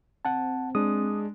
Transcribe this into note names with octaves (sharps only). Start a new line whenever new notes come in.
C4 F#5 A5
G#3 D4 D#6